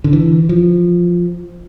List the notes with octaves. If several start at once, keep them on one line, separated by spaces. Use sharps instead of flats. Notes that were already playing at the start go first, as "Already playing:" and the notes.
D3
E3
F3